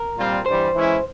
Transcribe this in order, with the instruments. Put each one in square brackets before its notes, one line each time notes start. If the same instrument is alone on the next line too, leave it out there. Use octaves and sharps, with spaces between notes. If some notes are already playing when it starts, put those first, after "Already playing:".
Already playing: [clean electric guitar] A#4
[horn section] A#2 G3 C4 F4
[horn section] G2 E3 G3 [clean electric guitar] C5
[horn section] E3 G#3 C#4 E4